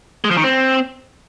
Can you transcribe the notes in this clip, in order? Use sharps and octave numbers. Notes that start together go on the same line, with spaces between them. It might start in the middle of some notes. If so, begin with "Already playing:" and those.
G#3
F3
D#3
C4